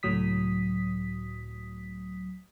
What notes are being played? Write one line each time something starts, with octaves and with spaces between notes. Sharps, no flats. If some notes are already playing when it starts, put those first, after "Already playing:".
C#2 A2 F#3 D#6 B6